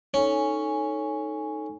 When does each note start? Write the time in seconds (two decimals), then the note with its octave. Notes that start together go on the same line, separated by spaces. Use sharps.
0.14 C#4 D#4 A4 G#5